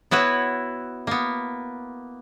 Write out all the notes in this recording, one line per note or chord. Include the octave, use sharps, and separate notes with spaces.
B3 E4 F#4 B4 C#5
A#3 B3